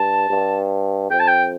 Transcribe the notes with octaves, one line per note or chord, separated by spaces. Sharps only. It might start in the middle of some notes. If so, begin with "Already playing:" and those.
Already playing: G2 A5
G2
F2 G5
A5
G5